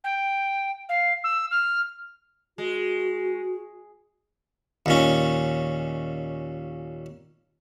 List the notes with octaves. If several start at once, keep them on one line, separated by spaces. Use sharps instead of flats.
G5
F5
E6
F6
G#3 F#4
D#2 A#2 C#4